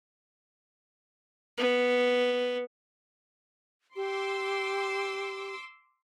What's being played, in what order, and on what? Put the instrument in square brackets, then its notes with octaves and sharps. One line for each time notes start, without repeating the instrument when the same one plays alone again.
[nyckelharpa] B3
[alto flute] G4 [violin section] C6 D6 E6